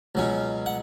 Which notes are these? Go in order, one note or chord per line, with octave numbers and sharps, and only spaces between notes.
C#2 B2 F#3 C#4
F#5